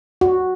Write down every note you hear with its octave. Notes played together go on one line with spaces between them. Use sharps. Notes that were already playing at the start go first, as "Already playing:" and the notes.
F#4